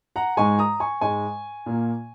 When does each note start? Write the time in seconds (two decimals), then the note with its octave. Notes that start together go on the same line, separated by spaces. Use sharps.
0.16 F#5 A#5
0.37 G#2 G#3 G#5 C#6
0.59 A#5 D#6
0.80 G#5 C#6
1.01 G#2 G#3 G#5 C#6
1.66 A#2 A#3